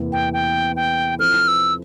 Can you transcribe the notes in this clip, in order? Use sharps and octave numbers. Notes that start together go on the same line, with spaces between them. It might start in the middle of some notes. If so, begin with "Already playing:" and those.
Already playing: E2 C3 E3 A#3
G5
G5
G5
F3 C4 E4 A4 C5 F6
E6